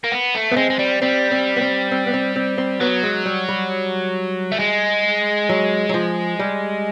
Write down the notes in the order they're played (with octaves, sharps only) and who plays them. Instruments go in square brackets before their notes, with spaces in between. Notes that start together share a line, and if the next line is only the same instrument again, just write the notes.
[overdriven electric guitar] A#3
B3
A3
[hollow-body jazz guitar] B3
[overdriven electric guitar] G#3 [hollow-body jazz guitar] C4
[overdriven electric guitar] G#3
G3
[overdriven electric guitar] G3 [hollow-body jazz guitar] C4
[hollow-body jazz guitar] C4
B3
C4
C4
B3
C4
C4
C4
[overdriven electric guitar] F#3 [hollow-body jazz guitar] B3
[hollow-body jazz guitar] G#3
G3
G3
[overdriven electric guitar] A3
G#3
[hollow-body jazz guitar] F#3
F#3
F3
G3